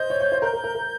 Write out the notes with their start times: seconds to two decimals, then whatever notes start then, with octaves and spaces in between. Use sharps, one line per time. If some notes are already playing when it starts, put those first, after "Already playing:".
Already playing: C5 D#5 G6
0.10 C#5
0.20 C#5
0.32 C5
0.42 A#4 G6
0.53 A#4
0.64 A#4
0.75 A#4